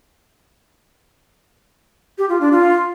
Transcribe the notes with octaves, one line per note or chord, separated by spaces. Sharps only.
G4
F4
D4
F4